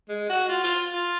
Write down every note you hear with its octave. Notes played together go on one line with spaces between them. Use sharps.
G#3
F#4
F4
F4
F4